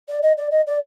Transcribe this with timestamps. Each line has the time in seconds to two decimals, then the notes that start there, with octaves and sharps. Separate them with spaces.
0.08 D5
0.22 D#5
0.37 D5
0.51 D#5
0.66 D5